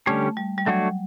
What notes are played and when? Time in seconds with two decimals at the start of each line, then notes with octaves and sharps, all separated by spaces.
0.06 D3 G3 A3 C#4 G4 C#5
0.37 G3
0.58 G3
0.66 F#3 A3 D4 F#4 C#5